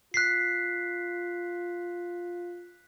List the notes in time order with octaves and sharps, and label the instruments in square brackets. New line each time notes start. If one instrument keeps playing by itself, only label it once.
[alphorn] F4 [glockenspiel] F#6 B6 C7